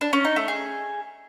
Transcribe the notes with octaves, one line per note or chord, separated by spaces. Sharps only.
D4
C#4
D#4
A3
G#4